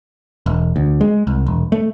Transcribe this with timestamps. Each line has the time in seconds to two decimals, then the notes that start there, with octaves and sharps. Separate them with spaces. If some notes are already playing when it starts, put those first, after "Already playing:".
0.46 E1
0.76 D2
1.01 G#3
1.27 C2
1.46 E1
1.72 A3